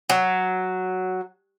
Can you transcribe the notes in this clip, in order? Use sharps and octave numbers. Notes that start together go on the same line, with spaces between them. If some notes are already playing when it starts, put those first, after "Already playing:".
F#3